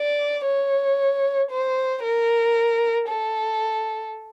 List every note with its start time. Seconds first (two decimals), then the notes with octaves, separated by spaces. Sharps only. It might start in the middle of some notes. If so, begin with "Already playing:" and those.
Already playing: D5
0.46 C#5
1.51 C5
2.03 A#4
3.08 A4